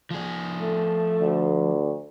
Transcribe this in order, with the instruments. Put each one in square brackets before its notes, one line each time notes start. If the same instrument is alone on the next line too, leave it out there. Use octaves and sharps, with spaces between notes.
[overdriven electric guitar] F3 G#4
[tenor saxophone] A3
[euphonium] D2